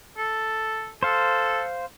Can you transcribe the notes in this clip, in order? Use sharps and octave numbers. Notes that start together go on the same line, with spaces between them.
A4
A4 C5 F5